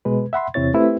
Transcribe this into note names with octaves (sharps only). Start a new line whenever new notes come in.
B2 G#3 B4
E5 F#5 B5 C6
E2 C3 C4 E4 C#5 A6
A3 C4 E4 G4 B4